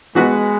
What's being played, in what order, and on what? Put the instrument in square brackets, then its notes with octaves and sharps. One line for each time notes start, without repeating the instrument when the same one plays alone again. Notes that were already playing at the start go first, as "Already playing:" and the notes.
[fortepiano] E3 B3 F#4 B4 [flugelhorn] G#3